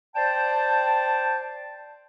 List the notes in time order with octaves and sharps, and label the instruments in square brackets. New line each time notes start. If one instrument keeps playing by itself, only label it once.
[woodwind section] C5 D5 G5 A5